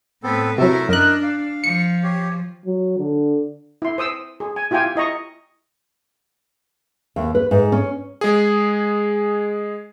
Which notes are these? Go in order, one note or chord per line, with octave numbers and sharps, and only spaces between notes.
A2 B3 C4 A4 B4
C3 F#3 A3 E4 A4 A#4
F#2 D4 A#4 D#5 F#6
F5
F3 C#7
G4 C#5
F#3
D3
E4 C6
C5 D#6 E6
G#4
G#5
E4 F4 G4 G5 G#5
E4 D#5 A#5 C#6
D#2
B4
G#2
C#4
G#3 G#4